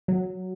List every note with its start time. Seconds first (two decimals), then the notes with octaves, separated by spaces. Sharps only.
0.08 F#3